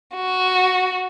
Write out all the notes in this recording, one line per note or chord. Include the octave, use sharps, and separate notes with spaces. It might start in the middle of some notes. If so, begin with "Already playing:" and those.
F#4